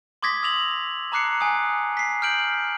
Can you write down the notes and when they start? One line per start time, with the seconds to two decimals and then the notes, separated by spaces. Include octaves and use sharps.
0.22 C6 D6 D#6 G#6 A#6 B6
0.42 D#6 E6 A#6 F7 F#7
1.12 A5 A#5 D6 F#6 C7 C#7
1.41 G#5 D#6
1.97 B6 C7
2.22 F6 G6 D7 F#7